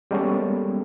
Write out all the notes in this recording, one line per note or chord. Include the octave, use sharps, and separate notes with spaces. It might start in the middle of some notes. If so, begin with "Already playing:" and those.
G3 G#3 A#3 B3 C#4 A4